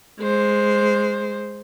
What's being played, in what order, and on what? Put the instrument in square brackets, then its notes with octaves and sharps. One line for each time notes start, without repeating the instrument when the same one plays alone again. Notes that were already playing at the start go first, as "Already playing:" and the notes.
[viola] G#3 C5